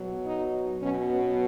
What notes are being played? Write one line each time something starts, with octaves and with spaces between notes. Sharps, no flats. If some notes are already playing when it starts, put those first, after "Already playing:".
Already playing: B2 F#3
D#4
B2 F#3 C#4
B3